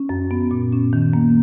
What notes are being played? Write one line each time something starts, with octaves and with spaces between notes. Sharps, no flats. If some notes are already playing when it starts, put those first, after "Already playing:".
Already playing: C#4
F#2
B3
A#2
C#4
D#3
A#3